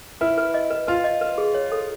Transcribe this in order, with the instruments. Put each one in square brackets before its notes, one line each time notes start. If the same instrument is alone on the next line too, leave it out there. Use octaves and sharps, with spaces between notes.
[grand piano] E4 [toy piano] B4
[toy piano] B4
D#5
B4
[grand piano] F4 [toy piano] B4
[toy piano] D#5
B4
G#4
C#5
A4